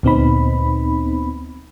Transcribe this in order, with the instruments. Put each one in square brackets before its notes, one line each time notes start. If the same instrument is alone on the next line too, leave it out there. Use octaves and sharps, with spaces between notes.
[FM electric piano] D2 A#2 B3 C4 D#4 B5